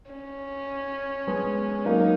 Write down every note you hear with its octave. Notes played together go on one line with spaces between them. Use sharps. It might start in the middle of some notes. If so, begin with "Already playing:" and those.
C#4
G#3 B3
F#3 A#3 D#4